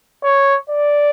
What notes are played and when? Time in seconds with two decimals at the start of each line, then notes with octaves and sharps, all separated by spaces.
0.24 C#5
0.70 D5